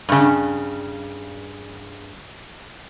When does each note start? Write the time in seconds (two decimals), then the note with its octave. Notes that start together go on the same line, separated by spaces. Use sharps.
0.09 G2 C#3